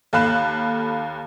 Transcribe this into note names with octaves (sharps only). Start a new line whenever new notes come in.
D#2 A4 F5 B5 F#6 E7